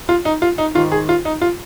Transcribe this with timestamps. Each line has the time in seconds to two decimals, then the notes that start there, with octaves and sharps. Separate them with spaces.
0.09 F4
0.25 D#4
0.42 F4
0.58 D#4
0.75 D#3 F4
0.78 G#2
0.92 G#4
1.09 F4
1.25 D#4
1.41 F4